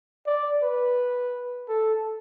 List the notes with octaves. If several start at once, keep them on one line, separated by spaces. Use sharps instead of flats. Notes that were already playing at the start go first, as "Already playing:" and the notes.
D5
B4
A4